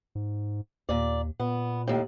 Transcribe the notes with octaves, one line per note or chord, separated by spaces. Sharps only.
G#2
D#2 A#2 D5
A#2 B3
D#2 A2